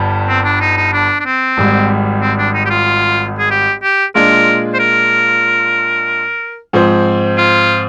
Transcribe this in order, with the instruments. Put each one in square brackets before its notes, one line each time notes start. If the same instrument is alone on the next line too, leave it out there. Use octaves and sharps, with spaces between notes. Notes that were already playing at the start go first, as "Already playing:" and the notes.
Already playing: [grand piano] G1 G2 D3 G3
[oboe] C4
D4
D#4
D#4
D4
D4
C4
[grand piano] G#1 G#2 G3
[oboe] C4
D4
D#4
G4
F4
G#4
G4
G4
[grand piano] A#2 G#3 D4 F4 [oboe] A#4
[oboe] C5
A#4
[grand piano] G#2 F3 C4
[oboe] F4